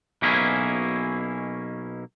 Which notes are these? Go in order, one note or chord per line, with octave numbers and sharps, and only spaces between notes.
B1 B2 A#3 C#4 E4 G#4